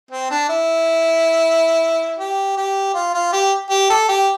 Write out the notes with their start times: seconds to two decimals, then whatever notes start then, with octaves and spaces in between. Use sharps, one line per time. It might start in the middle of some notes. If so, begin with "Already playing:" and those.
0.11 C4
0.30 D4
0.49 E4
2.19 G4
2.57 G4
2.94 F4
3.14 F4
3.33 G4
3.70 G4
3.90 A4
4.08 G4